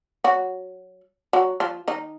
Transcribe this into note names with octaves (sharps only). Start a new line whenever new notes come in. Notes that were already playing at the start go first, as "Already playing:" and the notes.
F#3 F#4
F#3 F#4
F3 F4
D#3 D#4